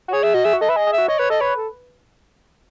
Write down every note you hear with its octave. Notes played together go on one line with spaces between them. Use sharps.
F#4
G#4 C#5
G#4 E5
F#4 D#5
G#4 E5
F#4
A4 D#5
B4 E5
G#4 D#5
G#4
E5
F#4
C#5 D#5
B4 C#5
A4 D#5
B4 C#5
A4